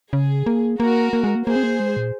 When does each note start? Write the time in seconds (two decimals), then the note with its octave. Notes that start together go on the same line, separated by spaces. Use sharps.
0.13 C#3 G#4
0.46 A#3
0.80 A#3 F#4 A#4
1.13 A#3
1.24 G#3
1.35 A#3
1.46 A#3 G#4 C5
1.56 C4
1.63 A#3
1.80 G#3
1.97 A#2